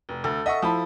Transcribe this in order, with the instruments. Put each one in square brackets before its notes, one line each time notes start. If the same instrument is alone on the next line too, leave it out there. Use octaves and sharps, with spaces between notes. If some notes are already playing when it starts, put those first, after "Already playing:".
[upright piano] F1
[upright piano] D2 [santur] A4
[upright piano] D#5 [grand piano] E5 F#5 C#6
[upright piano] F3 [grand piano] E4 A5 B5